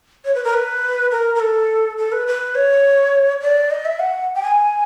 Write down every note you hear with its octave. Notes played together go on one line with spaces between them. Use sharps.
C#5
B4
A#4
B4
A#4
A#4
A4
A4
B4
B4
C#5
D5
D#5
E5
F#5
G5
G#5